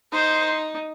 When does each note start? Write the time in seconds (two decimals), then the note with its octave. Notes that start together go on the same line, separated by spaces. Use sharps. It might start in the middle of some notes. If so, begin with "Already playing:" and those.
0.12 D#4 C5